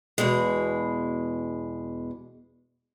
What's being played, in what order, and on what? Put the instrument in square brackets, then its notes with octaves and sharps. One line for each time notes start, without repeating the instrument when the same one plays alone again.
[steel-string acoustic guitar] E2 B2 G#3